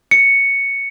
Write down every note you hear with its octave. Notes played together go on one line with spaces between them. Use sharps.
C#7